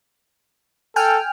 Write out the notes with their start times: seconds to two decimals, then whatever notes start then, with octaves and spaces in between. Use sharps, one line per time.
0.96 A4 G5 G#5 F6